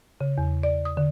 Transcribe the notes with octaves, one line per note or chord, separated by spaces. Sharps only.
C#3
E2
D5
D#6
D3